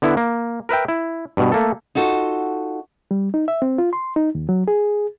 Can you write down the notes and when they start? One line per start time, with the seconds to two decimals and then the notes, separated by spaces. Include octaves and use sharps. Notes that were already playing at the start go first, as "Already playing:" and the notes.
0.02 D3 B3 E4
0.17 A#3
0.69 A#4 B4 E5 G5
0.88 E4
1.37 G2 B2
1.52 A3 A#3 A4
1.95 D#4 F4 F#4 A4
3.11 G3
3.34 D#4
3.48 E5
3.62 C4
3.78 F4
3.93 C6
4.16 D#4
4.35 D#2
4.49 F#3
4.68 G#4